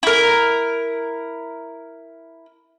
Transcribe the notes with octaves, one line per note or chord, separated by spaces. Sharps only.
E4 A#4